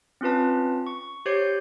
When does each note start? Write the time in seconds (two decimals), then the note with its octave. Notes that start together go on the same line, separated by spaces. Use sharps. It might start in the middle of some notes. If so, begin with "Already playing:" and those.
0.21 C4 C#4 F4 B4 A5
0.87 C#6
1.26 G4 C5 C#5 G6 G#6 C7